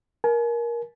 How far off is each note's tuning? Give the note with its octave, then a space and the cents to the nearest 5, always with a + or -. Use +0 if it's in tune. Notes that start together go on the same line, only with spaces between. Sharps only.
A#4 +15 G#5 +40